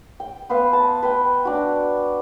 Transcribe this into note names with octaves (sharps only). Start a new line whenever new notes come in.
G5
B3 B4 C5 F5
A5
B4 G5
D4 F#4